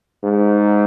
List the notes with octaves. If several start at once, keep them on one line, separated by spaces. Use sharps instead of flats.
G#2